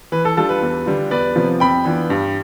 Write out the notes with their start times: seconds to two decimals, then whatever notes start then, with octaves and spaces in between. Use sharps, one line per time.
0.12 E3 B4
0.25 A4
0.37 G3 D4 F4 A4
0.49 B4
0.62 E2
0.86 D3 G3 D4 F4
1.11 E2 B4 D5
1.36 C3 F3 B3 F4
1.60 F2 G5 B5
1.85 E3 B3 D4 F4
2.10 G2